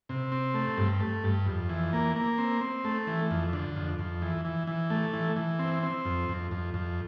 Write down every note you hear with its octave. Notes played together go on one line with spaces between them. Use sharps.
C3
C4
A3
G2
A3
G2
F2
E3
A#3
A#3
C4
C4
A3
E3
F2
D3
F2
F2
E3
E3
E3
A3
E3
E3
C4
C4
F2
F2
F2
F2